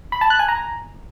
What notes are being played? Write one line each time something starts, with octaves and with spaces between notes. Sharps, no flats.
B5
A5
F#6
G#5
A#5